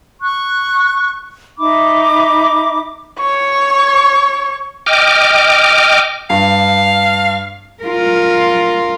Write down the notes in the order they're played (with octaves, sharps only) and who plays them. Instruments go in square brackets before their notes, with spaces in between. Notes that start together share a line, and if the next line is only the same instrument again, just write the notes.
[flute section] C#6 F#6
D#4 E5 B5 D6
[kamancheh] C#5 C#6
[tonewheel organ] D#5 G5 D6 F6
[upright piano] G2 [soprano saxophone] F5
[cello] F4 A#4